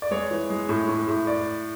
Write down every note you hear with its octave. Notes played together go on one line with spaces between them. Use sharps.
D5
G#3 C#5
E3
G#3
A2
A2
A2
D5